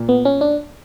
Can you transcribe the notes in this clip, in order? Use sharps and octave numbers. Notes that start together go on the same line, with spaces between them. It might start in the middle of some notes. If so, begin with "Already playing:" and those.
Already playing: A#2
B3
C#4
D4